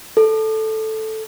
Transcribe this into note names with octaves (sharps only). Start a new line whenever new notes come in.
A4